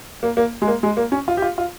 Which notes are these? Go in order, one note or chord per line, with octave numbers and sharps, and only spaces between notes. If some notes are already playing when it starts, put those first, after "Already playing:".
A#3
A#3
G#3
A#3
G#3
A#3
C#4
F4
G4
F4
F4